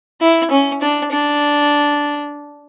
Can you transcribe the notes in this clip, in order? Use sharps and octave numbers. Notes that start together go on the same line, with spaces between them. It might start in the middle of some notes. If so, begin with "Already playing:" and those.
E4
C#4
D4
D4